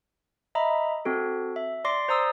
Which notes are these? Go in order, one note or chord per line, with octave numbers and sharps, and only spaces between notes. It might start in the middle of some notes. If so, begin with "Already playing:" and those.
D#5 E5 A#5 B5
C4 F#4 A4
E5
D5 C6 D6 A#6 C7
C5 D5 A#5 D#6 E6